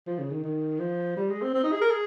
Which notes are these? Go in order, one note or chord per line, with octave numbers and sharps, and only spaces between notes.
F3
C#3
D#3
D#3
F3
G3
G#3
C4
C4
D#4
G#4
A#4
G#4